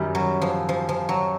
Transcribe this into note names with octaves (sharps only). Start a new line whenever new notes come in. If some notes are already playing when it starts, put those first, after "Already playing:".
Already playing: F#2 D#3 G3
F#3
F3
F3
F3
F#3